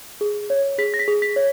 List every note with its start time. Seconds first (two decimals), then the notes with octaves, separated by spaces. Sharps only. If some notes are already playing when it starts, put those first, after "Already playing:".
0.21 G#4
0.50 C#5
0.78 G#4 B6
0.94 A#6
0.99 B6
1.08 G#4
1.22 B6
1.36 C#5